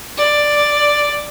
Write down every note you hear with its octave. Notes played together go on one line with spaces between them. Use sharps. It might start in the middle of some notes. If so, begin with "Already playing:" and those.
D5